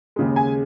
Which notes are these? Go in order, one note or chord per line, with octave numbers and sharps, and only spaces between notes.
D#2 C#3 G#3
G#5